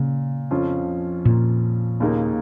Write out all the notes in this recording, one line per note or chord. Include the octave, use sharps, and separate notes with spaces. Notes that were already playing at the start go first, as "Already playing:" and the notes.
Already playing: A#2 C#3
F2 F3 C#4 F4
A#2
D#2 C#3 A#3 D#4